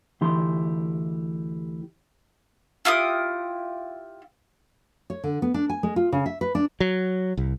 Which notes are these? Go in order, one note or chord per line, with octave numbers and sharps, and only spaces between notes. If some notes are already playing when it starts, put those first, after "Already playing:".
D2 E3 E4 G4 C6
E4 F4 G4 D#6
C#5
D3
B3
D4
G#5
G#3
F4
C#3
E5
B4
D4
F#3
C2